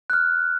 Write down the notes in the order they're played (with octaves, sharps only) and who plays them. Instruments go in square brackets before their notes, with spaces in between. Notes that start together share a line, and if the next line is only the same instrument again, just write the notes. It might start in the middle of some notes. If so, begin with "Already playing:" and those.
[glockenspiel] F#6
F6